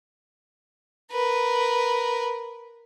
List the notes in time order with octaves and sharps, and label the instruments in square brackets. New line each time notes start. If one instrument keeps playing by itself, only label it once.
[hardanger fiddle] A#4 B4